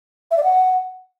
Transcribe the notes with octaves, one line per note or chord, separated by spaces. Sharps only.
E5
D5
F#5